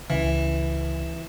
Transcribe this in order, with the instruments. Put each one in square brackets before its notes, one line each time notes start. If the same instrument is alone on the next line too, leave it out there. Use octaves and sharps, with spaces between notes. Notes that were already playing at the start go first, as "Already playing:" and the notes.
[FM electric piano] C#2 C#3 [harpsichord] E3